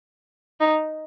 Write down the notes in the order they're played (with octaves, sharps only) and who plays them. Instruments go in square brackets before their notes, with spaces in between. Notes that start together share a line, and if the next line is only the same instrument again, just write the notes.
[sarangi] D#4